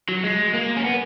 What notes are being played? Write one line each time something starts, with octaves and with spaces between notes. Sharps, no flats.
F#3
G#3
A#3
C#4
B3